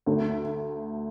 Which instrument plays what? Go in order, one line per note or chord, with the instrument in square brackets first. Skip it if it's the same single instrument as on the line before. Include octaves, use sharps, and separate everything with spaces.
[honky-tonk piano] D2 D3 A3